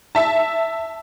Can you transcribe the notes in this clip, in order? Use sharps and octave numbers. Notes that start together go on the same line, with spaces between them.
E5 A5